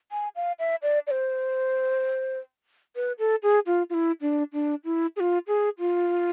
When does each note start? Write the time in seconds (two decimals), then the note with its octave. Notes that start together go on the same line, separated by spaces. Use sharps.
0.12 G#5
0.36 F5
0.59 E5
0.82 D5
1.07 D5
1.11 C5
2.96 B4
3.19 A4
3.43 G#4
3.66 F4
3.90 F4
3.94 E4
4.21 D4
4.53 D4
4.84 E4
5.16 G#4
5.20 F4
5.47 G#4
5.79 F4